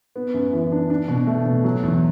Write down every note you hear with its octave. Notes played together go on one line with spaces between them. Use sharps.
B3
F#2
E3
D4
D4
B2
A3
B2
F#3
E2